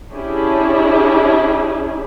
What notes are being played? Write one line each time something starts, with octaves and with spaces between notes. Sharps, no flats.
C#4 D4 E4 G4 G#4